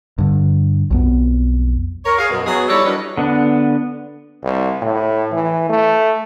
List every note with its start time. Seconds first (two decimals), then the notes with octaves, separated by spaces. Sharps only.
0.18 G2 D3
0.91 B1 F2 B3
2.05 A#4 C#5
2.17 G#4 F5
2.30 F#2 B2
2.46 F#3 B3 G#4
2.69 G3 D#4 E4 A4 C#5 D5
2.85 F#3 G3 D4 A#4 B4 D#5
3.18 D3 B3 D4
4.43 C2
4.82 A2
5.32 E3
5.69 A3